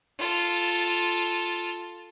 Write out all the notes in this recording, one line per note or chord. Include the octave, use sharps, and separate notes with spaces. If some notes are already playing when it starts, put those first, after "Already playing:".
F4 A4